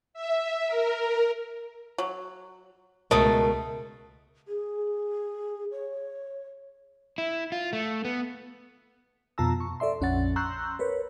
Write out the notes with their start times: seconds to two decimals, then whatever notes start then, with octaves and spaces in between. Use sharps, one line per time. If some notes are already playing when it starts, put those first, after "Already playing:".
0.14 E5
0.67 A#4
1.98 F#3
3.11 C#2 B2 A3 A#4 D#5 A5
4.48 G#4
5.72 C#5
7.18 E4
7.52 F4
7.73 A3
8.05 B3
9.38 F2 B2 F4 A5 A#5 E6
9.60 C#6
9.80 A4 D5 E5 C6
10.00 A#1 F2 C#4 C#5 F#5 A6
10.36 A#5 C6 C#6 E6 F#6 G6
10.79 A#4 B4 C#5